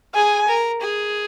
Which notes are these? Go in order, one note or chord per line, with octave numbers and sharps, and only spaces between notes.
G#4 G#5
A#4
G#4